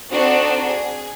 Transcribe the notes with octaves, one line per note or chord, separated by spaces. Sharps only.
C4 D4 D#4 F#4 A4
G#4